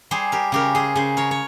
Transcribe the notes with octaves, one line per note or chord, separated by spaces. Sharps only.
G3 G#4 C5
G4 A#4
C#3 G4 A#4
G#4 C5
C#3 G#4 C5
A#4 C#5
C#5